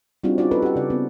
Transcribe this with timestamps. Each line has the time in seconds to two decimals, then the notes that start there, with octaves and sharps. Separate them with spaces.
0.24 G3 C4 D4 D#4 F4 F#4
0.38 C#4 D#4 F4 F#4 D5
0.51 A4 B4
0.62 G4 F#5
0.76 C#3 D5
0.90 B3 C4